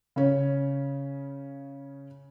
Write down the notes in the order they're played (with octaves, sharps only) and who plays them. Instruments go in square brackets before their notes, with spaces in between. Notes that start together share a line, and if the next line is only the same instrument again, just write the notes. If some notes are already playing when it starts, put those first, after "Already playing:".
[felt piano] C#3 C#4